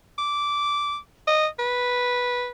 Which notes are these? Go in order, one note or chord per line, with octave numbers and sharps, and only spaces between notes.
D6
D#5
B4